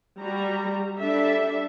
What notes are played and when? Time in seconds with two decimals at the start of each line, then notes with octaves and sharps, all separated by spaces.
0.19 G3 F#4 A#5
0.99 G3 D4 A4 E5